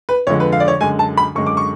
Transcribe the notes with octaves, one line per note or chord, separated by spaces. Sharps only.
B4
F2 D3 G#3 C#5
B4
F5
D5
C#5
F#2 D3 G#3 G#5
A5
B5
F#2 D3 G#3 C#6
D6
C#6